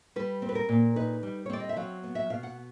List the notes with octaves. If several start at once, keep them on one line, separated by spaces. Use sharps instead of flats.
G3 B4
C4
B4
A#4
A#2
D#4 B4
G3
C#5
C4 D5
D#5
E5
F#3 F5
B3
E5
B2 F5
F#5